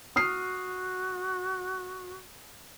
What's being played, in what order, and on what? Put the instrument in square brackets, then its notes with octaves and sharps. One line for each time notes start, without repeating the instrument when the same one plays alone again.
[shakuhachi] F#4 [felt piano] D#6 F6 C7